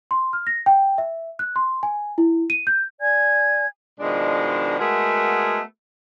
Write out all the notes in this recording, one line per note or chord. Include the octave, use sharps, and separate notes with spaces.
C6
F6
A#6
G5
E5
F#6
C6
G#5
E4
D#7
G6
D5 G#5 G#6
B2 D#3 F3 G#3 D4
G#3 A3 B3 F#4 G#4 A#4